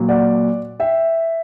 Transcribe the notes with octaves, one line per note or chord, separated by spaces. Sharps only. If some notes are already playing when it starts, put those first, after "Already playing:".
Already playing: A#2 F#3
D5 F#5
E5 G5